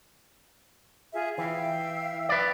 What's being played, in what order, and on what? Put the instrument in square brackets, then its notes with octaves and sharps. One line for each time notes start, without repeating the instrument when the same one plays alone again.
[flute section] F4 G#4 E5
[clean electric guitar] E3 [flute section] E5 F5 G5
[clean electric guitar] B4 D5